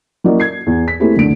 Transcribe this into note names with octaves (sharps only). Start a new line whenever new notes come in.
F#3 A#3 C#4 E4 D5 D#5
G#6 C7
E2
B6
A3 A#3 C4 E4 G4 G#4
F#1 D2 D3 D7